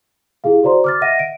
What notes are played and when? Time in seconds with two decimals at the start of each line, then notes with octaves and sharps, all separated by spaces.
0.44 E4 G4 G#4 F5
0.63 F#4 C5 D5 A#5 C6
0.84 D6 F6 A6
1.01 D#5 E5 F#5 A#6 D#7
1.19 D7